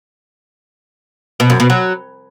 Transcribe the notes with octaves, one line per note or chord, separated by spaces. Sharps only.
B2
F#2
B2
F#3